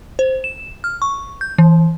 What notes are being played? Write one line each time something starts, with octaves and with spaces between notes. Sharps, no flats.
C5
E7
F6
C#6
G6
E3